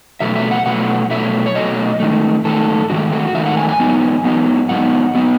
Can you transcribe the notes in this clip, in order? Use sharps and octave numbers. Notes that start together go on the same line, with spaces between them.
B2 F#3 A3 E5
E5
F#5
B2 F#3 A3 F#5
B2 F#3 A3 E5
C#5
B2 F#3 A3 D#5
G#2 D#3 A3
G#2 D#3 A3 A4
G#2 D#3 A3 F#4
F#4
G#2 D#3 A3 E5
F#5
G#5
G#5
G#2 F#3 B3 D#4
G#2 F#3 B3 D#4
G#2 F#3 B3 D#4 F#5
F#3 B3 D#4